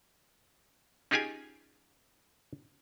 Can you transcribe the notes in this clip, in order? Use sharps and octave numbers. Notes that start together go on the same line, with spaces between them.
C#4 D#4 F4 G4 G#4 G#5